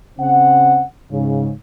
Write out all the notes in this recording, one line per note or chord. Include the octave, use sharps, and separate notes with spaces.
C#3 C4 F#5
G#2 C#3